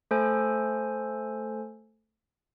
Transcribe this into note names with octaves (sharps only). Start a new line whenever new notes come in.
A3 A4 C5 G#5